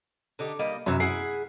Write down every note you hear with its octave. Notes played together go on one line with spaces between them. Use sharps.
D3 D#4 G4
G3 A#3 D#5
F#2 C3 E3 E5
E4 G#4 F#5 C7